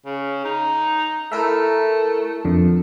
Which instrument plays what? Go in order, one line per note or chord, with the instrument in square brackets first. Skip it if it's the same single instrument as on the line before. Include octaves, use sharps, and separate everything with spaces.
[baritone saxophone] C#3
D#4
[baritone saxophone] A3 [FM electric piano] E4 A#4 E5
[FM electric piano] F2 D3